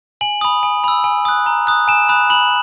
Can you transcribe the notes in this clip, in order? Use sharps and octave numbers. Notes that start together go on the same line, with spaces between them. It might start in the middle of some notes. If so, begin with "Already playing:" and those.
G#5 F#7
B5 D#6
G#5
B5 E6
G#5
D#6 F#6
A#5
D#6 F#6
G#5 E7
B5 D#6 F#6
B5 F#7